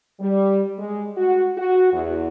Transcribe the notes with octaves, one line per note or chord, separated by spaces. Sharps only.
G3
G#3
F#4
F#4
E2